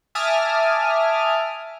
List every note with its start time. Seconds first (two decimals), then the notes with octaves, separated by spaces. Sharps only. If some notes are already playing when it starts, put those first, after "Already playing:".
0.15 E5 G#5 A5 D6 D#6 F6